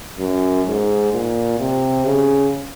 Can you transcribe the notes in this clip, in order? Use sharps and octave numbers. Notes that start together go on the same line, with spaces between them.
F#2
G#2
A#2
C3
C#3